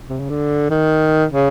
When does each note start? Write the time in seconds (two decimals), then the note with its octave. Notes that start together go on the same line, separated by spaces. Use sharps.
0.09 C3
0.19 C#3
0.29 D3
0.70 D#3
1.32 C#3